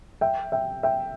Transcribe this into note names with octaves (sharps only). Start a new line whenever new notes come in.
E5 G5
E5 G5
E5 G5